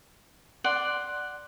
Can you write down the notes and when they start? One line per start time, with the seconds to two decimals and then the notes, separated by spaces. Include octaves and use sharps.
0.64 D5 F#5 C6